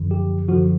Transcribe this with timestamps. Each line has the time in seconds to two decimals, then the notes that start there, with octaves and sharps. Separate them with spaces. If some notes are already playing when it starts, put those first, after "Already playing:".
Already playing: F#2 D3 F3
0.11 G4
0.48 F#2 D3 F3 F#4